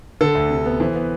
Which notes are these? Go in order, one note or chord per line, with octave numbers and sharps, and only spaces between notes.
D3 A4
D2
C3
B3
E3 C5
B3